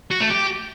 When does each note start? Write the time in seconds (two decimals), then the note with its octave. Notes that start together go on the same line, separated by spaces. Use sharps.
0.11 F#4
0.21 A3
0.30 G4